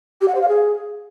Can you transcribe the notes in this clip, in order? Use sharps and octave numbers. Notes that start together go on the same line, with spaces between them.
G4
F#5
C5
F5
G#4